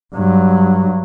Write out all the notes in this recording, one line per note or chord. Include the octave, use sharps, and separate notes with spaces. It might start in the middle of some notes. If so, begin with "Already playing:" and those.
G2 F#3